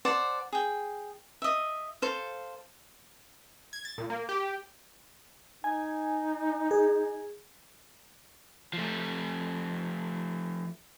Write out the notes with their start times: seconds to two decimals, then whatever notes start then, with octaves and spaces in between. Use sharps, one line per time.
0.05 C5 D5 F#5 A5
0.53 G#4 G5
1.42 D#5 E5
2.02 A4 C5 F5
3.73 G#6
3.85 A6
3.98 A#2
4.10 A#3
4.29 G4
5.64 D#4 G#5
6.71 G#4
8.73 F3 A3